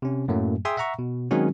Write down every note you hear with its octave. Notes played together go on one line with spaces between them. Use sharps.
C3 C#4
F#2 A2 F#3 A3 A#3
G#4 E5 G5 G#5 C6 D#6
E5 F#5 A#5 C#6
B2
D#3 F#3 G#3 C4 C#4 F#4